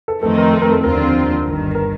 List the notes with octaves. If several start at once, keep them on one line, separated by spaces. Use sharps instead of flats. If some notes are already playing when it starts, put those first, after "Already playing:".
A4
F2 D#3 A3 C4 D#4 A4
A#4
A4
A#4
A4
D#2 D3 F3 C4 F4 A#4
G1 G2 D#3
A#4